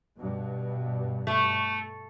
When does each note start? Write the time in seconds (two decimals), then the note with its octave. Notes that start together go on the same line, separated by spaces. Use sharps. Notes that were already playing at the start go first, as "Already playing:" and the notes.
0.18 G2 B2
1.27 A3